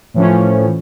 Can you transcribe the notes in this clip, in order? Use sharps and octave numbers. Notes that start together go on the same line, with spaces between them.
A2 E3 F3 C#4